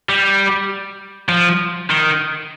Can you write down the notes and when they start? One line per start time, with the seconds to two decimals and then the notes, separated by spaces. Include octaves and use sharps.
0.09 G3
1.29 F3
1.90 D#3